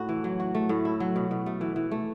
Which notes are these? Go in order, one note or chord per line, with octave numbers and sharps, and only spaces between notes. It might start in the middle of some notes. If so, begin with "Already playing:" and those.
Already playing: A2 F#4
E3
F#3
F#4
A3
A2
E4
F#3
B2
B2
A3
E3
E3
A3